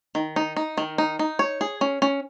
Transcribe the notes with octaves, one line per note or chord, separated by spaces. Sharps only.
D#3
D#4
D#4
D#3
D#4
D#4
C#5
G#4
C#4
C#4